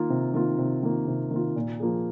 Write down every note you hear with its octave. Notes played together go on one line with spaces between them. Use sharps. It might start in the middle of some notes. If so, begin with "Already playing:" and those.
Already playing: D#3 A#3 F4
C3
D#3 A#3 F4
C3
D#3 A#3 F4
C3
D#3 A#3 F4
A#2
F3 A#3 F4 G#4